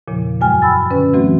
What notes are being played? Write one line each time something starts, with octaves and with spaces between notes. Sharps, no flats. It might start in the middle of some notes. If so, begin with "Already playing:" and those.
E2 A#2 C#3 F3
F#2 F#3 G#3 G5 G#5 F6
G5 B5 E6 A6
D3 C#4 B4
E3 F#3 A3 C4 F#4